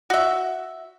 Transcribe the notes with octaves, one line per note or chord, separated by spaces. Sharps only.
F#4 E5